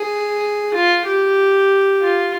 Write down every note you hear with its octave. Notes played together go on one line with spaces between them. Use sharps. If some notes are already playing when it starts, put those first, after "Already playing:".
Already playing: G#4
F4
G4
F4